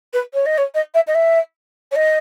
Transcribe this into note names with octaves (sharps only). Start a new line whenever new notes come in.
B4
C#5
D#5
C#5
D#5
E5
D#5
E5
C#5
D#5